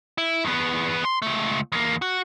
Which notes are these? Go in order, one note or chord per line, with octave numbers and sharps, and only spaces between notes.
E4
E2 B3
C6
C#2 A3
E2 A#3
F#4